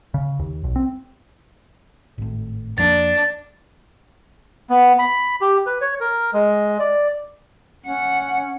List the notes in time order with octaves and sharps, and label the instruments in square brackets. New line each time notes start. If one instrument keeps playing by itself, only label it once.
[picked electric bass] C#3
D#2
B1
C4
G#1 A2
[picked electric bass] F2 F3 A#3 [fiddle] D4 [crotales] A6
[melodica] B3
B5
G4
B4
C#5
A#4
G#3
D5
[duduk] C#4 [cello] F#5